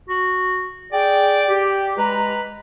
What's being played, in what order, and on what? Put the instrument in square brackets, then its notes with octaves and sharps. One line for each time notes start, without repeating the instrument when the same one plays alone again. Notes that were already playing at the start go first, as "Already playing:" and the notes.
[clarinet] F#4
[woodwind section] G#4 G5 [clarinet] D5
[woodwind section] G4
[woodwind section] G#3 A#5 [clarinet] B4